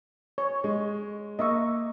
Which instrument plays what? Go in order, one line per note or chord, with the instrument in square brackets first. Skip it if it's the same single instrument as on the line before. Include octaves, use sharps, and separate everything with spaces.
[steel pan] C#5
[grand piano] G#3
[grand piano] A#3 [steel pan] D#5 E5 C#6